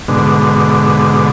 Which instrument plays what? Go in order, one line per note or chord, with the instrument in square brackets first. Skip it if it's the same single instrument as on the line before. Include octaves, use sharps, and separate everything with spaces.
[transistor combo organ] G#2 B2 D3